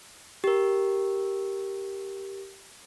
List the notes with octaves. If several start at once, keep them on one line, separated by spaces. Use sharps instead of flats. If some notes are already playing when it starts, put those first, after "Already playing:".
G4 A#4